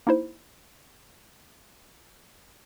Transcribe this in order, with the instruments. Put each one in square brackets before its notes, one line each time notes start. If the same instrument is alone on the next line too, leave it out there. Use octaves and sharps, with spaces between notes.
[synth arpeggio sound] A#3 D#4 E4 C5